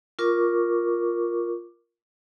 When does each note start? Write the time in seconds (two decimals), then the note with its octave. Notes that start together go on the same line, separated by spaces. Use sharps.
0.19 F4 A#4 C#6 D6